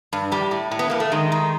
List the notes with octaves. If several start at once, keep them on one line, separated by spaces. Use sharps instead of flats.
G2
A2 G3
A2
A2
B3
A2 A#3
A3
D#3 G#3
D#3